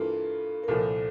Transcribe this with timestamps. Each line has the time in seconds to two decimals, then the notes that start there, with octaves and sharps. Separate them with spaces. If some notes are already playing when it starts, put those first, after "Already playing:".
Already playing: G2 E3 A#3 F4 A4
0.64 A#4
0.68 C2 A#2 F3 A4